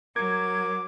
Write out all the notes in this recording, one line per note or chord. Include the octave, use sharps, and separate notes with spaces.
F#3 A#4 D6 G#6